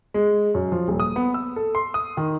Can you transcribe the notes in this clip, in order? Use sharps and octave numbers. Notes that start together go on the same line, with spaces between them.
G#3
F#2
F3
D#1
D#6
B3
E6
A4
C6
D#6
D#3